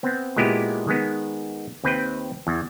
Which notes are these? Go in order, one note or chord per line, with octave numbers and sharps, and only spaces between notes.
B3 C4
A#2 G#3 B3 E4 G4
D#3 G#3 B3
D#2 C4 B4 G5
E2